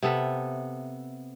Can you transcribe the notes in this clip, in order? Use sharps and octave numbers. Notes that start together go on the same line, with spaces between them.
C3 B3 A4 E5